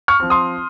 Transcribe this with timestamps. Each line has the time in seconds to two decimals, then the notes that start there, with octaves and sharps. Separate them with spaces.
0.08 C#6 F6
0.20 F3 C4
0.30 C6 D#6